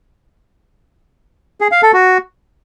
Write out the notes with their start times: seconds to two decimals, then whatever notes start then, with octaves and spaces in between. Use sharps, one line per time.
1.61 G#4
1.72 F5
1.82 A4
1.93 F#4